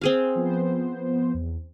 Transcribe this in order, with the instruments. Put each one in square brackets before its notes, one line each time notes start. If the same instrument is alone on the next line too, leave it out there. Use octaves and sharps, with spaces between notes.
[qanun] C4 G#4 F5
[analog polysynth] F3 B3 C5
E2